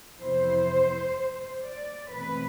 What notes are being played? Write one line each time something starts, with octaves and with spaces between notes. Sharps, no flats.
F2 C3 E3 B3 E4 C5
D5
E2 B2 A3 C4 B4